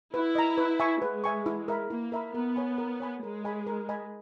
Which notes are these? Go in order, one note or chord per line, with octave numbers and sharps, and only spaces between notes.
E4 B4
D#5 A#5
B4
E5 G#5 C#6
G#3 B4
E5 G#5 C#6
E4
A#4 E5 B5
A#3 E4
A#4 E5 B5
B3 A#4
C#5 G#5 B5
A#4
C#5 G#5 B5
G#3 A#4
D#5 G#5 B5
A#4
D#5 G#5 B5